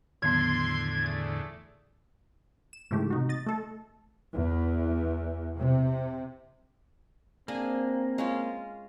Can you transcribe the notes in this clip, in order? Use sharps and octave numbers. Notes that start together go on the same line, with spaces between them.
E2 A2 D3 D#3 F#3 B3 C6 G#6
A3 G#4 D5
E7
G#2 C#3 E3 A3 G4
C3 D#4 F#4
D#5 A6
A3 A4
E2
C3
A#3 C4 D4 G#4 G#5
G#3 C#4 F4